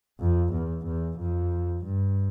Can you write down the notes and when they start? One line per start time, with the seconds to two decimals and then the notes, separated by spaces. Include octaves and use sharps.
0.20 F2
0.52 E2
0.86 E2
1.19 F2
1.85 G2